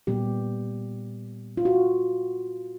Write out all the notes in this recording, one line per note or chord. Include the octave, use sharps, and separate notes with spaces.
A#2 G3 B3 G4
F4
F#4